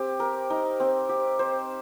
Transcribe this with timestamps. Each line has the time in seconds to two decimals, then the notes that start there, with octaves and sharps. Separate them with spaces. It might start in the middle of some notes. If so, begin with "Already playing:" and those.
Already playing: C4 G4
0.20 A#4
0.50 D#4
0.80 C4
1.09 G4
1.39 C5